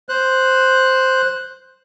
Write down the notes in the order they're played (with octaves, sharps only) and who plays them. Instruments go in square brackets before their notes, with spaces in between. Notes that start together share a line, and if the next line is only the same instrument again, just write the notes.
[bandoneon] C5 F#6